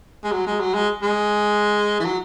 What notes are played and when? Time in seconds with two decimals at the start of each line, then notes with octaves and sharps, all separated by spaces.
0.24 G#3
0.32 F#3
0.47 G#3
0.60 F#3
0.74 G#3
1.02 G#3
2.00 E3
2.05 F#3